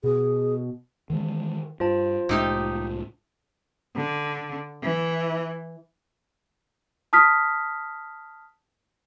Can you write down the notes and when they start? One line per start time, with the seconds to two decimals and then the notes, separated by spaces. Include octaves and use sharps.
0.04 B2 G#4
1.10 D#3 E3 G#3
1.80 G2 F4 C5 A5
2.29 C2 A2 C3 G#3 D#4 G4
3.96 D3
4.83 E3
7.13 A5 D#6 F6 B6